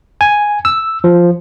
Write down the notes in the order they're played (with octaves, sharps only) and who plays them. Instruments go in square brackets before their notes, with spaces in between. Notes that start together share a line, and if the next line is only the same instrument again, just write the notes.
[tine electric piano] G#5
E6
F3